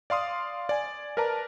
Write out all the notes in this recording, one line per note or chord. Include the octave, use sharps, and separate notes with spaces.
D5 F5 C6 D#6
D5 G#5
A#4 B4 D5 A5 A#5